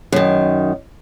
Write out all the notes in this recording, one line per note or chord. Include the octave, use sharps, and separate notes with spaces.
F#2 D#3